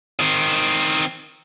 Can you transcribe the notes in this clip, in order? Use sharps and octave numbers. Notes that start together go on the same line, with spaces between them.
D#3 C4